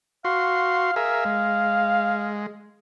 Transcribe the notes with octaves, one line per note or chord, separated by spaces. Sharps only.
F#4 F5 C6
G#4 A#4 E5 F5
G#3